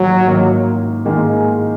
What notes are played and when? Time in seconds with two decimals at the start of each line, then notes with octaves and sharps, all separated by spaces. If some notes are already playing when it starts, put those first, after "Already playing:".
Already playing: G#2 D#3 F#3 A#3
0.26 G#2 D#3 A#3
1.05 G#2 D#3 G#3 A#3